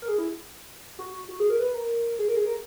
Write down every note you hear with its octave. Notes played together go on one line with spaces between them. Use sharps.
A#4
G#4
E4
F#4
F#4
G#4
A#4
B4
A#4
G#4
A#4
G#4
A#4